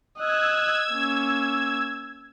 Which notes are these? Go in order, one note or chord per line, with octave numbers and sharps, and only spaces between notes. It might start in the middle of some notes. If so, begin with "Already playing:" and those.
D#5 E6 F#6 G#6
A#3 C#4